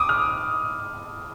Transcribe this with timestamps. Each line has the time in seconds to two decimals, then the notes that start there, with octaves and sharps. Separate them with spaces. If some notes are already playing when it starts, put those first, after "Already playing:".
Already playing: D6 D#6
0.09 F6